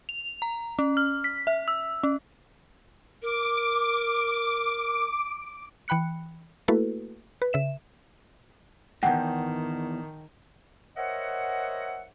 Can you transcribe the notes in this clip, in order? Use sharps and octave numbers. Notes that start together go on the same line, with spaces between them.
F7
A#5
C#4
F6
B6
E5
E6
C#4
A#4 D6
E3 G5 B5 F#6 C#7
A3 A#3 E4 F#4 A4 B4
B4
C#3 E5 E7
E2 G#2 D#3 F#5 G5 A5
A#4 C5 C#5 D#5 E5 F#5